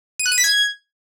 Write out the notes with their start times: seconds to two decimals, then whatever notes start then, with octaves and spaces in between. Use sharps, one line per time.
0.19 D#7
0.26 F#6
0.32 D#7
0.38 B6
0.44 G#6